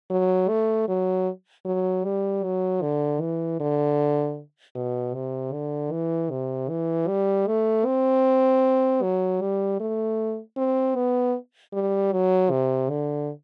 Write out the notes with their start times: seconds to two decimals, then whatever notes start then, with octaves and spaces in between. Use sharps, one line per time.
0.10 F#3
0.49 A3
0.88 F#3
1.65 F#3
2.05 G3
2.44 F#3
2.82 D3
3.21 E3
3.60 D3
4.75 B2
5.14 C3
5.53 D3
5.92 E3
6.30 C3
6.69 E3
7.08 G3
7.47 A3
7.86 C4
9.03 F#3
9.41 G3
9.80 A3
10.57 C4
10.95 B3
11.73 G3
12.12 F#3
12.51 C3
12.90 D3